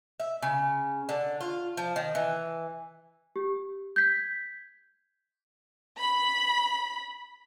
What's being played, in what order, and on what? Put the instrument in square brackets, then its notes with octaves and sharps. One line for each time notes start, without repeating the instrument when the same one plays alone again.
[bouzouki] E5
C#3
D3
F4
F3
D#3
E3
[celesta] G4
G6 G#6 B6
[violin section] B5